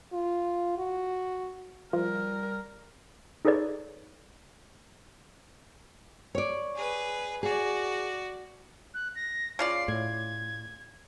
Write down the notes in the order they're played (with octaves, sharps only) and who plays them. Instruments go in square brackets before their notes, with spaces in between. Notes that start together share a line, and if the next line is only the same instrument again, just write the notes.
[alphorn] F4
F#4
[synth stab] F3 [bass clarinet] G3 [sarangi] A#4
[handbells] D#4 G#4 A4 B4 C#5 D5
[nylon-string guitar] C#5 D5
[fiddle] G#4 B4
[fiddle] F#4 D5 [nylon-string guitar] G#4
[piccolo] F#6
A#6
[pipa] C#3 F4 D5 [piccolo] C7
[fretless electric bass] A2 [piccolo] G#6